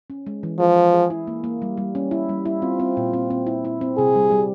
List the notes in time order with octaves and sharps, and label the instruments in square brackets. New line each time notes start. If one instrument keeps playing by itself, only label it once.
[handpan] C#4
G#3
E3
[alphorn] F3 [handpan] G#4
[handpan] G#4
G#4
E4
A#3
A#3
G3
G3
C#4
E4
G3
E4
[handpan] C4 [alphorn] F4
[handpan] C4
A#2
C4
C4
E4
E4
C4
[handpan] C3 [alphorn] G#4
[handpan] G3
G3